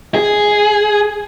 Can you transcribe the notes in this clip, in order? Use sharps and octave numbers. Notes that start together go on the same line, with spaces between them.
G#4